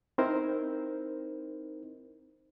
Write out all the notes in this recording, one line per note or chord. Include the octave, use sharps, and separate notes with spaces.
C4 D#4 E4 A#4 C5